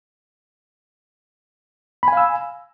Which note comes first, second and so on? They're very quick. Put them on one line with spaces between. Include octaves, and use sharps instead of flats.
B5 G#5 F5 E6